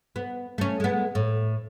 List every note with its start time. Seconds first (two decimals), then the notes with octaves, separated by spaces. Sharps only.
0.16 B3
0.58 A3 C#4
0.80 G#3 B3
1.15 A2